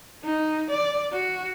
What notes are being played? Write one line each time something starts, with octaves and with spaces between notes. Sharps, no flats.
D#4
D5
F#4